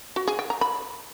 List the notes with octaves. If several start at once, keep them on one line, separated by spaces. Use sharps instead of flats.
F#4
G#4
G5
A#5
B5